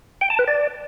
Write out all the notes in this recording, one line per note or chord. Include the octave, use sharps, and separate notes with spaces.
G5
A5
B4
D5